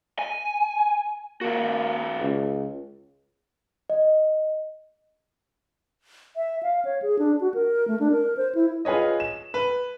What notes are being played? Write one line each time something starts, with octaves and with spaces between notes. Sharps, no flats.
G#5
D#3 A#3 F#4
C#2
D#5
E5
F5
C#5
G#4
D4
F#4
A#4
A3
D4
A#4
C5
E4
F4 G#4 B4 C#5 D#5
E7
B4